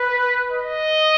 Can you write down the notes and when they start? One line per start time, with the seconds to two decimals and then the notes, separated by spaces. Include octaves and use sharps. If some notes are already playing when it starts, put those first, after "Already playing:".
Already playing: B4
0.51 D#5